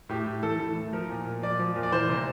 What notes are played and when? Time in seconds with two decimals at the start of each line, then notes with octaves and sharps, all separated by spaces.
0.09 A2 G4
0.27 A2
0.43 E3 A4
0.59 E3
0.76 A2
0.93 F3 A#4
1.09 A#2
1.26 A#2
1.42 F3 D5
1.59 F3
1.76 A#2
1.83 D5
1.92 E3 C5
2.09 C3